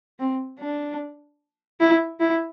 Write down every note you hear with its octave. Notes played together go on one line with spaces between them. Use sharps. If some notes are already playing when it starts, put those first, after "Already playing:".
C4
D4
E4
E4